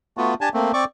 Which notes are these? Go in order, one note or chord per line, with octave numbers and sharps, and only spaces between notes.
A3 B3 F4 F#4
D4 G4 G#5 A5
A3 A#3 C4
C4 D5 C#6 D6